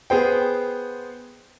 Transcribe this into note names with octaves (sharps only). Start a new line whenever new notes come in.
B3 G#4 C5 G5